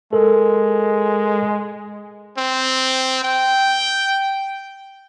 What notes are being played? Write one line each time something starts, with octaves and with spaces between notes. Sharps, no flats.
G#3 A4 A#4
C4
G5